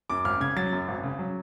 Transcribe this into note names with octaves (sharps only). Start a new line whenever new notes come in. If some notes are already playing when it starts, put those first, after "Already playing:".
F#2 D6
G#1 F6
C#3 G#6
F#3 A6
F#2
G#1
C#3
F#3